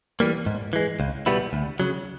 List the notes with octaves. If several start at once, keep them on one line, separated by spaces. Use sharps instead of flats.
E3 G3 A#3
G#2
E3 G#3
C#2
B2 G3 B3 E4
D2
C#3 F#3